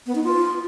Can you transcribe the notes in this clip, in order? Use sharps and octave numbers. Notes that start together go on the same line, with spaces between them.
B3
D#4
F4